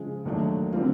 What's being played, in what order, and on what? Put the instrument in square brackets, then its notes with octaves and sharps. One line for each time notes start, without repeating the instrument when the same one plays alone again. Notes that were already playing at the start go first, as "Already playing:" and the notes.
Already playing: [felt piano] C#3 F3 G#3
D#2 D#3 F#3 A3 D4
D3 G3 C4 F4